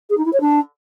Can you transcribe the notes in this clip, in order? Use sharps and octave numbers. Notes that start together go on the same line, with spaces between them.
G#4
D#4
E4
C#5
D4